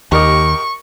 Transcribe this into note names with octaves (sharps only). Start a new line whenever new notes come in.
D#2 G4 A#4 D#5 C#6